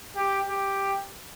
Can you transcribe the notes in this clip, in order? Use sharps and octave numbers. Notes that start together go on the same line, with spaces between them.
G4
G4